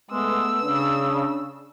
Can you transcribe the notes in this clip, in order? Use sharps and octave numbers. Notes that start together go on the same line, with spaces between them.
G#3 A3 B3 E6
C#3 C#4 D4